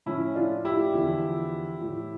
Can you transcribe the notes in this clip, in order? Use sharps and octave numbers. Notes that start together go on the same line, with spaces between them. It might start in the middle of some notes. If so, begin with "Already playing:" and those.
A2 F3 C#4 E4
D4 F4
E4 G4
E2 D3 F3
A2 F3